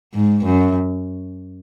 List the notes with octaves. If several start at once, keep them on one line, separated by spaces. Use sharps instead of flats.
G#2
F#2